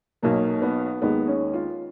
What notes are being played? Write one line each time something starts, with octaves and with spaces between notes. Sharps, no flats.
B1 B2 F#3 A#3
B3
D#2 D#3 G#3 B3
C#4
F4